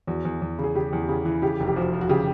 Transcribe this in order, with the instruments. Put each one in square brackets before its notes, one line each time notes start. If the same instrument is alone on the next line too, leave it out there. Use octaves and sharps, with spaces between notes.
[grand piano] E2 [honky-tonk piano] F#4
[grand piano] E2
E2
C#3
[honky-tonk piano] G#4
[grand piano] C#3 [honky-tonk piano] G4
[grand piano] E2
C#3
E3
[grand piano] C#3 [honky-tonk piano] G4
[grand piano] F1
[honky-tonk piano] G4
[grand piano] F3 [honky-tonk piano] F#4
[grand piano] F3
[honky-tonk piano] F#4
[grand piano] C#3 [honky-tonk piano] G4